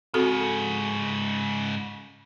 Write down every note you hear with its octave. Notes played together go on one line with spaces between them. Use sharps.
G#2 C#3 C4 F#4 A4